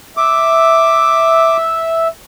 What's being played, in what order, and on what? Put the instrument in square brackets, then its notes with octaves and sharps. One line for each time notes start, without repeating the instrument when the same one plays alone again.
[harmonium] E5 [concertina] D6